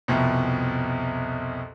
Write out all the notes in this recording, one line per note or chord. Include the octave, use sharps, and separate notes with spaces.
C2 F2 B2